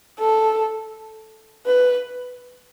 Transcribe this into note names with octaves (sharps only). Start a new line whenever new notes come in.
A4
B4